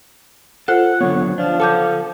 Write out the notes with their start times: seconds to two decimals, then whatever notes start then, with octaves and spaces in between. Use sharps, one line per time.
0.68 F4 A4 C5 F#5
1.01 D3 F#3 B3 C#5
1.38 F3 D4
1.60 A4 F#5 A5 D6 G6